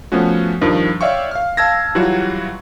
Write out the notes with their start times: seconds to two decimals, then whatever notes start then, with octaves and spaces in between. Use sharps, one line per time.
0.12 F3 A3 B3 C#4 F#4
0.61 G2 D#3 F3
1.01 C#5 D5 E5 F5 G5 C#6
1.31 F5 F6
1.57 F5 A5 E6 G#6 A#6
1.95 E3 F#3 G3 F4 F#4